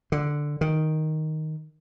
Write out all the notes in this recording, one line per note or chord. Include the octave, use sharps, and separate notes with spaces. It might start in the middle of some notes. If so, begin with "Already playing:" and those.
D3
D#3